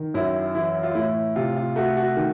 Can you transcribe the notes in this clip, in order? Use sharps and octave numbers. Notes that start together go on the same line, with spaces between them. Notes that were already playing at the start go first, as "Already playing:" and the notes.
Already playing: D#3
F#2 E4
E3 E4
F4
A2 E4
C3 F4
F4
A3 F#4
F#4
D#3